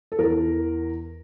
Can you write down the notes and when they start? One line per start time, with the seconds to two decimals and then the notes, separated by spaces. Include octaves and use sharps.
0.12 A4
0.18 E2 E3 A#4